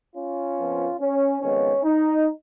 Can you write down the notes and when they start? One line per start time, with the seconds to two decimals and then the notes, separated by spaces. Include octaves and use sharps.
0.16 C#4 F4
0.58 F2 F3 B3
1.00 C#4
1.42 F2 D#3 G#3 B3 C#4
1.84 D#4